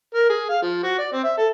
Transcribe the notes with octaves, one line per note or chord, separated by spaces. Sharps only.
A#4
G#4
F5
F3
F#4
D5
C4
E5
A4